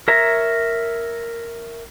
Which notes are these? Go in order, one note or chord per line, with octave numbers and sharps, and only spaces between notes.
A#4 C#5 E5 A#5